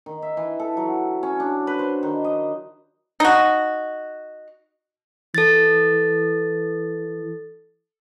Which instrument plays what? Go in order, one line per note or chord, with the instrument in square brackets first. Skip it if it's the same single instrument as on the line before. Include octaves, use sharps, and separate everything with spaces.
[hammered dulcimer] D#3
E5
E3
A4
F#3
C#4
D4
B4
C5
D#3
D#5
[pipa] D#4 F#4
[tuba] E3 [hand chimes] A4 A6